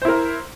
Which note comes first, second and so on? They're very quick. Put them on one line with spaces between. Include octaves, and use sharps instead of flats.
C5 E4 A#4